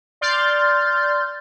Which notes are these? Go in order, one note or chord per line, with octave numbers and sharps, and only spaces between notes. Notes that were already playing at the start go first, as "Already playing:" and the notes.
D5 C6 F6 G6 A6